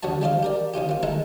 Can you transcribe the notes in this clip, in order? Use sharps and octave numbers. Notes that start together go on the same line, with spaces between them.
D2 B3 F#4 C#5 A5
G3 G#3 D4 F4 C5 F5
G4 A#4 D5
D#3 C#4 F4 G4
C4 F4
D#3 G#3 A3 D#4 E4 B4